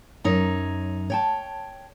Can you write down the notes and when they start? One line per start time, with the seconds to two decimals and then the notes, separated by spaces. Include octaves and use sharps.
0.24 F#2 D#4 C#5
1.10 C#5 G5 A5